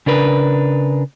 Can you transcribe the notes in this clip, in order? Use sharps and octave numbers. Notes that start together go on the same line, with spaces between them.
C#3 D4 A#4 B4